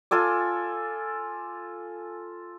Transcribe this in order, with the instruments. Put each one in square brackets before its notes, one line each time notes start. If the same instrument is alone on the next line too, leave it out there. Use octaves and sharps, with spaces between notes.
[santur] F4 A4 G#5 D6